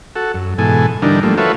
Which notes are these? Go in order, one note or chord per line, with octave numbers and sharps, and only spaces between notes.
F#4 A4
F#2
G#2 B2 E3 A4 G#5
D3 E3 G3 D4 D#4 A#4
F3 G3 A3 A#3
F4 F#4 A4 B4 C#5 E5